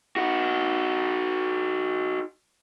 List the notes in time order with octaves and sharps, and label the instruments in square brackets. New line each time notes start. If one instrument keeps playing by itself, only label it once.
[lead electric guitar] D#4 F#4